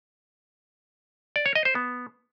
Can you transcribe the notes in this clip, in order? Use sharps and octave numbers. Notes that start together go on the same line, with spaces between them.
D5
C#5
D#5
C5
B3